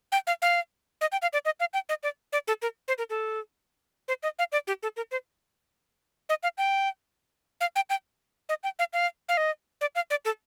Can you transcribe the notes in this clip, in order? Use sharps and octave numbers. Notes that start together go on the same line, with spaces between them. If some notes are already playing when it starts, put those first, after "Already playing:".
G5
F5
F5
D#5
G5
F5
D5
D#5
F5
G5
D#5
D5
D5
A4
A#4
C5
A#4
A4
C5
D#5
F5
D5
G4
A4
A#4
C5
D#5
F5
G5
F5
G5
G5
D#5
G5
F5
F5
F5
D#5
D5
F5
D5
A4